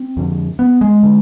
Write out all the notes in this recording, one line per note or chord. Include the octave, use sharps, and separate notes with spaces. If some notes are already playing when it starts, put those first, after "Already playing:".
Already playing: C4
F2 D3
B3
G#3
D3